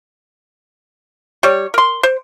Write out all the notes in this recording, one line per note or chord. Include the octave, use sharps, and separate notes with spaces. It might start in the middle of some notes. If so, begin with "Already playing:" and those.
G3 C#5
A#4 C6
C5